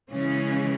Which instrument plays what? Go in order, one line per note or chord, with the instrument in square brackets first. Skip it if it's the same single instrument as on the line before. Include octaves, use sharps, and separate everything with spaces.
[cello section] C#3 E3 G#3 C#4